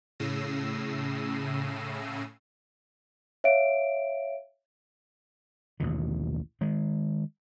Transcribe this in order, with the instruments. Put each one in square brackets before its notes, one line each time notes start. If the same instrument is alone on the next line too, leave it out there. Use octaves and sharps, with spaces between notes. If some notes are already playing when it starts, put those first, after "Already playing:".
[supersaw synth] A2 C#3 E6 A#6 C7 D#7
[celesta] C#5 E5 F5 D7
[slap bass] A1 D#2 B2 D3
D#3 G#3